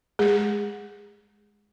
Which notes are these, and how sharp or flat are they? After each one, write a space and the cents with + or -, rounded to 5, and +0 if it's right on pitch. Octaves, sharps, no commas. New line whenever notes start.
G#3 +0 G#4 -25